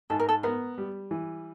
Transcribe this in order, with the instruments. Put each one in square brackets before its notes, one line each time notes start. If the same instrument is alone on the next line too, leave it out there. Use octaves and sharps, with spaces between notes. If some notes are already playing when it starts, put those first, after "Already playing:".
[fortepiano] G#2 [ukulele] A4
[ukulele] A#4
A4
[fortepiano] B3 [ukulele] A#4
[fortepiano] G3
E3